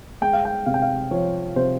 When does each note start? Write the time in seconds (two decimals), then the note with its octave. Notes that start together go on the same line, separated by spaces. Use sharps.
0.21 G#3 G5
0.33 F5
0.45 G5
0.66 C3 F5
0.74 G5
0.82 F5
1.11 F3 C#5
1.56 C3 C5